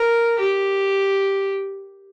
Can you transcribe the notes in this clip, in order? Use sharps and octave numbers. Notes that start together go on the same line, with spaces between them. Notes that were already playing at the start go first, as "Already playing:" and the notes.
Already playing: A#4
G4